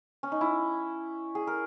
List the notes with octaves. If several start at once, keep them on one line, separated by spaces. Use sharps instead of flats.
C#4
D#4
E4
G#4
A#4